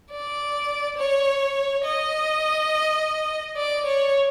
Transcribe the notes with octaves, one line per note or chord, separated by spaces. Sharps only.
D5
C#5
D#5
D5
C#5